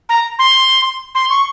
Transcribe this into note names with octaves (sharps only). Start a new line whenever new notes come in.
A#5
C6
C6
C#6